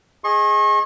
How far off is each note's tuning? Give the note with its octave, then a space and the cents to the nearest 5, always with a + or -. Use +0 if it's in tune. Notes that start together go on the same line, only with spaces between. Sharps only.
G#4 +0 D#5 +0 C#6 -40